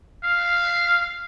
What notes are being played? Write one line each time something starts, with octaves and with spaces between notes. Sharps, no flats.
F5